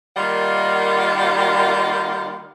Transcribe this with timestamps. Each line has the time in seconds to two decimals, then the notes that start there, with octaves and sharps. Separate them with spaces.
0.16 D#3 G3 A#3 F4 D#5 F#5